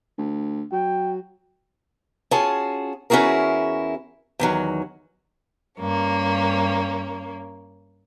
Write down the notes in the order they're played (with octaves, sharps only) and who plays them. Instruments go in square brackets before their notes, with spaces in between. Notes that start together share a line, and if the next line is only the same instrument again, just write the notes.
[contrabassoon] D2
[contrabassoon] F#3 [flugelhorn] G5
[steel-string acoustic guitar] C#4 F4 F#4 G#4 A5
E2 C#4 E4 F#4 G#4 A#4
E2 D#3 F#3
[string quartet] G2 A#3 C#4